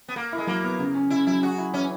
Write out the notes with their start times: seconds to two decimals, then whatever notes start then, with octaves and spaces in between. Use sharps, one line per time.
0.08 B3
0.16 A#3 A#4
0.33 E4
0.38 G#3
0.47 F#3 A#3
0.64 B3
0.79 C#3
0.95 C#4
1.10 C#3 E4
1.27 F#3 E4
1.43 F#4 G#4
1.58 E4
1.74 E3 C#4